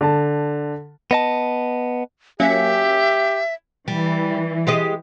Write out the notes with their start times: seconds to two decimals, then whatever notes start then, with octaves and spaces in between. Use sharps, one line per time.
0.01 D3 A5
1.11 B3 D#5 A5
2.40 F#3 A#3 C#4 G4 E5
3.88 E3 G3
4.67 G#3 G4 D#5